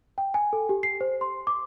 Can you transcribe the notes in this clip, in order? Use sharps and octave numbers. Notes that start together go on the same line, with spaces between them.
G5
G#5
A4
G4
C7
C5
C6
D6